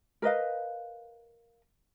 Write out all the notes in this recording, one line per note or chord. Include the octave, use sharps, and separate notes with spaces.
A#4 B4 D#5 F5